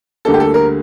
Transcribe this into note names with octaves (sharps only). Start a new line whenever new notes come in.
D2 D3 G3 A#3 A4
G4
A4
A#4